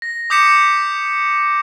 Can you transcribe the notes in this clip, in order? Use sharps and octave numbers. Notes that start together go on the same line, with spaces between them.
A#6
D6 D#6 G6 B6 C#7 E7